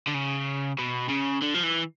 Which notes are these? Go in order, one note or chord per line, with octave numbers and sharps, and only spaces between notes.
D3
C#3
B2
C#3
D3
F3
E3